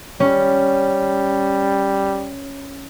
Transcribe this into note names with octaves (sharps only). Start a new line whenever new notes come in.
G3 C#4